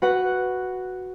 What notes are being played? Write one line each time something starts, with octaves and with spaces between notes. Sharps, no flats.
F#4 B4 F#5